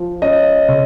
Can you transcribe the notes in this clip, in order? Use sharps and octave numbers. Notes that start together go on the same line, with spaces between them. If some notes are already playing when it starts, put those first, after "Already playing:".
Already playing: F3
C#4 D#5
C#3